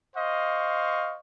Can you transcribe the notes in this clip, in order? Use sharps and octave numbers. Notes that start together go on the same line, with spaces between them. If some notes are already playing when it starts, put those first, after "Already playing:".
C5 D#5 F5 C#6